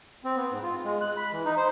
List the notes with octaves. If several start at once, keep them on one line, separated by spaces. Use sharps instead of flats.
C4
B3
G#2
F4
G#3
F#6
B5
E3
D#4
C5